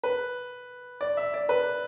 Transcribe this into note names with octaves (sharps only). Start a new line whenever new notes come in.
B4
D5
E5
D5
B4